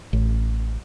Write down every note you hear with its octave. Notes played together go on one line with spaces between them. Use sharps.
A1